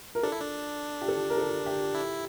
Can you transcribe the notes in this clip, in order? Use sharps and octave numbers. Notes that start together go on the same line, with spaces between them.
A#4
D4 A4
E4
D4
G4
A4
A#4
A4
G4
E4